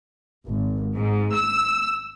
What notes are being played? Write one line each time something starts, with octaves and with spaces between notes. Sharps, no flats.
G#1
G#2
E6